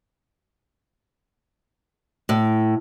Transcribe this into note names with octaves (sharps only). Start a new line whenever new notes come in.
A2